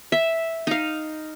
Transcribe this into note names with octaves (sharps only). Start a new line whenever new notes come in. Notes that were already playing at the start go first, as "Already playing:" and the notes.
E5
D#4 F5